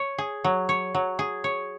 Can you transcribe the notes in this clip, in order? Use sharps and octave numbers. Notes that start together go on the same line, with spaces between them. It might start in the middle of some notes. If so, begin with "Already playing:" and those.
Already playing: C#5
G#4
F#3
C#5
F#3
G#4
C#5